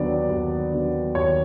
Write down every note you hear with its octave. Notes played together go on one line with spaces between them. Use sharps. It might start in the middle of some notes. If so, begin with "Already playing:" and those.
Already playing: D#2 D3 F#3 B3 D5
D#2
D3 F#3 B3
D#2 C#5